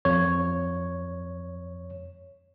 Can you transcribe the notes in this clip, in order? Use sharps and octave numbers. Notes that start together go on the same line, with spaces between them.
F2 C#5